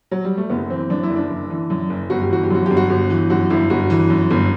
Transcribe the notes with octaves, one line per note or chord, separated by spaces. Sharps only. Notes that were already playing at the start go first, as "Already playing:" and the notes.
F#3
G3
A3
F#1 B3
E3 C4
F#2 D4
E4
F#1
D4
F#1
E3
F#2
F#1
G1 F#4
G4
E3 F#4
G4
F#2 F#4
G1 G4
F#4
G1
E3
F#2 F#4
G1 E4
G1 F#4
E3
F#2
G1